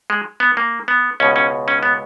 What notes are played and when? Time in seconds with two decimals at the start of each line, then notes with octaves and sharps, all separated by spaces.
0.10 G#3
0.40 B3
0.57 A#3
0.88 B3
1.20 C#2 B2 C#4
1.36 C#4
1.68 C#4
1.83 B3